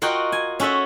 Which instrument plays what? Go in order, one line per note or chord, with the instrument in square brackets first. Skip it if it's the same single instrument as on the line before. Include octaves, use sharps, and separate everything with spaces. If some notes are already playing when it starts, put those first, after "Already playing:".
[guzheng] F4 F#4 A#4 D#5 F#5 G5
G#5
C#4 F#4 A4 E5 F#5